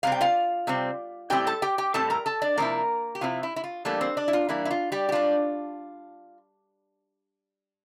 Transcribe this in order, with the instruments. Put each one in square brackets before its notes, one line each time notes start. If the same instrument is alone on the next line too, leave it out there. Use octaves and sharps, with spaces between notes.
[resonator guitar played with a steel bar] C3 G3 C4 F5
G5
F4 F5
C3 G3 C4
A2 G3 C4 E4 G4 G5
A4 A5
G4 G5
G4 G5
A2 G3 C4 E4 A4 A5
A#4 A#5
A4 A5
D4 D5
C3 F3 A#3 C4 E4 A#4
G4
C3 F3 C4 E4 F4
E4
E4
F4
E3 G3 A3 A#3 D4 A4
C4 C5
D4 D5
E4
F4
E3 G3 A#3 D4 E4
E4
F4
G3 G4
G4
G3 D4 F4